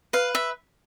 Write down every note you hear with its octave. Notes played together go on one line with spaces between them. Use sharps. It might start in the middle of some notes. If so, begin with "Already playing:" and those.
B4 F5
E5